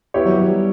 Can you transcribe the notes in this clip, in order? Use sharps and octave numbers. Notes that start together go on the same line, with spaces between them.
B3 E4 G4 C#5
F#3
F#3
G3